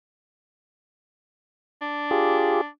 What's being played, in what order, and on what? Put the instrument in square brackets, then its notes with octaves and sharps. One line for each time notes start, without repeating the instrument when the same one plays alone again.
[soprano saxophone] D4
[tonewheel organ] F4 G4 G#4